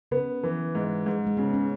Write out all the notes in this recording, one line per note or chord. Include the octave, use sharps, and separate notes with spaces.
C#3 B3
E3
G#2
G#2
G#3
C#3 B3
C#4